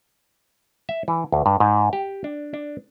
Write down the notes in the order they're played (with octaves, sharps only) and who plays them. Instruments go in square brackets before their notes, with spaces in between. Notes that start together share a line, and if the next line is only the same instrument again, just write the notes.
[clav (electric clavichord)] E5
E3
D2
G2
G#2
G4
D4
D4